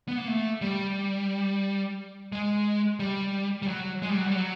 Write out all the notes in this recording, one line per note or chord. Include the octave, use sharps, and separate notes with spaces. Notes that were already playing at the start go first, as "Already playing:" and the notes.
B3
A#3
A3
G3
G#3
G3
G3
F#3
G#3
G3
F#3
G3
F#3